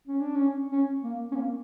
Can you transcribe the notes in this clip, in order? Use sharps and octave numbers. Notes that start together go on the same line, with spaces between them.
C#4
D4
C#4
C#4
A#3
C#4
A#3